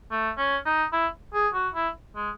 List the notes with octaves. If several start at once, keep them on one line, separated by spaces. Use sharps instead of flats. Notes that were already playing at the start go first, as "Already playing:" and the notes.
A3
C#4
D#4
E4
G#4
F#4
E4
G#3